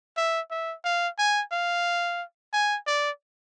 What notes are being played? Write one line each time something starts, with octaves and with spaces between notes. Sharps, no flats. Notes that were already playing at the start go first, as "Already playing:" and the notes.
E5
E5
F5
G#5
F5
G#5
D5